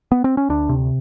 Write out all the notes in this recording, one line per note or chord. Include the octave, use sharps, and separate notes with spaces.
B3
C4
C#4
D2 D4
C3